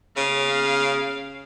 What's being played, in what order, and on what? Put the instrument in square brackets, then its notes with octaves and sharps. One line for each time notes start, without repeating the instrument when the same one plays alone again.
[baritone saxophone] C#3 [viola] F5